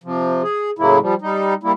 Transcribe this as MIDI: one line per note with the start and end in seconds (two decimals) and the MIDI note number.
0.04 0.42 48
0.04 0.42 53
0.43 0.70 68
0.79 0.98 45
0.79 0.98 49
0.79 0.98 54
0.79 0.98 58
0.79 0.98 64
1.01 1.14 53
1.01 1.14 55
1.22 1.54 55
1.22 1.54 63
1.63 1.72 55
1.63 1.72 58
1.63 1.72 64